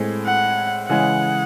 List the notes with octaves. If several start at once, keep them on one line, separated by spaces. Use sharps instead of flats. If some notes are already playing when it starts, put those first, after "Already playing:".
Already playing: A2 G#3 C4
F#5
C#3 E3 G#3 F#5